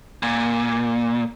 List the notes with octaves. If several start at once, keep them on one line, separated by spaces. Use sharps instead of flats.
A#2